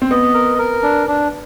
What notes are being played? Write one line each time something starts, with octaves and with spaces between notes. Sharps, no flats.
C4
B3 D#5
A#4
A#4
D4
D4